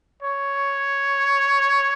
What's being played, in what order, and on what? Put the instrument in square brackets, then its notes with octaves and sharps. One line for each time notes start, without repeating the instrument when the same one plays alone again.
[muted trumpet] C#5